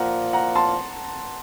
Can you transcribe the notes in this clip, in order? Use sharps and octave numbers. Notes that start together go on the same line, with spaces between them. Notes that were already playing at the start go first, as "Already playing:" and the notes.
Already playing: A#2 F3 A#3 F4 F#5 A#5
F#5 A#5
A5 C6